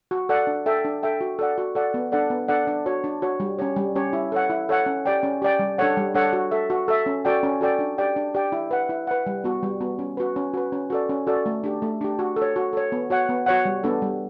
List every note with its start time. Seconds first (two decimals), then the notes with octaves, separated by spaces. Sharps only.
0.11 F#4
0.29 A4 D5 F#5
0.47 D4
0.66 A4 E5 G5
0.85 D4
1.03 A4 E5 G5
1.21 F#4
1.39 A4 D5 F#5
1.58 F#4
1.75 A4 D5 F#5
1.94 B3
2.12 D4 A4 D5 F#5
2.30 B3
2.48 D4 A4 D5 F#5
2.67 D4
2.86 F#4 C#5
3.04 D4
3.22 F#4 C#5
3.40 G3
3.59 C#4 G4 C#5
3.76 G3
3.96 C#4 G4 C#5
4.13 E4
4.32 A4 C#5 F#5
4.50 E4
4.69 A4 C#5 F#5
4.86 C#4
5.06 G4 D5 G5
5.23 C#4
5.42 G4 D5 G5
5.59 G3
5.78 D4 A4 C#5 F#5
5.97 G3
6.14 D4 A4 C#5 F#5
6.33 F#4
6.51 A4 E5
6.70 F#4
6.88 A4 E5
7.06 C#4
7.25 F#4 A4 D5 G5
7.43 C#4
7.61 F#4 A4 D5 G5
7.79 D4
7.98 G4 D5 G5
8.16 D4
8.35 G4 D5 G5
8.52 E4
8.71 B4 F#5
8.89 E4
9.07 B4 F#5
9.27 G3
9.44 B3 F#4
9.63 G3
9.80 B3 F#4
9.99 C#4
10.17 F#4 B4
10.36 C#4
10.54 F#4 B4
10.72 C#4
10.90 F#4 A4 D5
11.10 C#4
11.27 F#4 A4 D5
11.46 A3
11.64 D4 G4
11.82 A3
12.01 D4 G4
12.19 F#4
12.36 A4
12.42 C#5
12.56 F#4
12.73 A4 C#5
12.92 B3
13.10 F#4 C#5 F#5
13.29 B3
13.46 F#4 C#5 F#5
13.65 G3
13.83 B3 D4 A4
14.02 G3